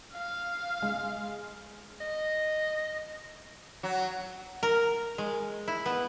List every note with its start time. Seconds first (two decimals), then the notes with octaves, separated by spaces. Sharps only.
0.13 F5
0.82 G#3
2.01 D#5
3.83 F#3
4.63 A#4
5.18 G#3
5.68 E4
5.86 B3